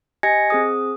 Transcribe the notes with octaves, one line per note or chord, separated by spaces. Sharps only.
G4 D#5 G#5 G#6 A#6 C#7
C4 G#4 D#6